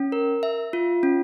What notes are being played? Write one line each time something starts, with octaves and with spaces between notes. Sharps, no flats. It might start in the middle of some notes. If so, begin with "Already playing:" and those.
Already playing: C#4
A#4
E5
F4
C#4